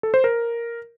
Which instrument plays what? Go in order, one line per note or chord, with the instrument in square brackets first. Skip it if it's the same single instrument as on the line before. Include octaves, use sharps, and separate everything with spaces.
[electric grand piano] A4
C5
A#4